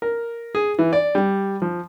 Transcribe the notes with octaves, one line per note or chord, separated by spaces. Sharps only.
A#4
G#4
E3
D5
G3
F3